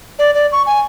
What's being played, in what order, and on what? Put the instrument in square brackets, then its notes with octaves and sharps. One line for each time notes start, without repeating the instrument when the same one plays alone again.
[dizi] D5
D5
C#6
G#5